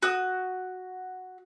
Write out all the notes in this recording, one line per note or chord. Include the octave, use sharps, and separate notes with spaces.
F#4 D#6